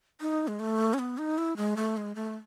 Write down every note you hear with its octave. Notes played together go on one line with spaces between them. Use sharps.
D#4
G#3
A3
C#4
B3
D#4
E4
G#3
A3
G#3
A3